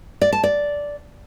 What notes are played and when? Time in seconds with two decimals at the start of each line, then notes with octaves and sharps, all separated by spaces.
0.21 D5
0.32 A5
0.43 D5